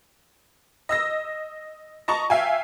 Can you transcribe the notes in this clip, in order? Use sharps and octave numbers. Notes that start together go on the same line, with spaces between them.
D#5 E6 A#6
D#5 A5 A#5 C#6
E5 F5 G5 G#5